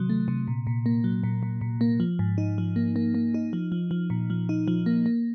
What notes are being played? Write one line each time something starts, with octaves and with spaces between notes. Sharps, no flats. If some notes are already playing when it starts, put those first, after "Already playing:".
Already playing: C3 D#3 F#3
A3
C3
A#2
A#2
A#3
F#3
A#2
A#2
A#2
A#3
F3
G#2
D#4
F3
A#3
A#3
A#3
D#4
F3
F3
F3
A#2
F3
D#4
F3
A#3
A#3